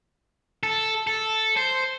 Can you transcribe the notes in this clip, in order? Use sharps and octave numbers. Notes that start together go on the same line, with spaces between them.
A4
A4
C5